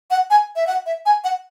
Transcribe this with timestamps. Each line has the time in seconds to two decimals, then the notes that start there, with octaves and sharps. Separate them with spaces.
0.11 F#5
0.30 G#5
0.56 E5
0.67 F#5
0.86 E5
1.06 G#5
1.24 F#5